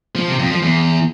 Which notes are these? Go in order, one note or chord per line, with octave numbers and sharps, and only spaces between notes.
F3
C3
F2
F3
E2